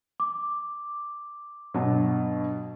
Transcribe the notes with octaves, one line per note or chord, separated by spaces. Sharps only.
D6
G2 B2 F#3